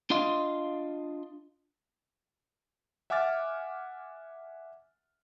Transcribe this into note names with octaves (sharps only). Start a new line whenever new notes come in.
D4 F4 D#5 F5 C6
E5 F#5 G#5 D6 F6 A6